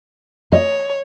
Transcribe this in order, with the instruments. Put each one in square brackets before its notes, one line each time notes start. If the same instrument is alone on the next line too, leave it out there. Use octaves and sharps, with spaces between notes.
[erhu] C#5 [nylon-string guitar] D#5